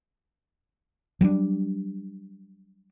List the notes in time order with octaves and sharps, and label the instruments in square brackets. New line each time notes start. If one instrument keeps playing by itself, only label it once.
[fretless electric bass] F#3 G3 C#4 D4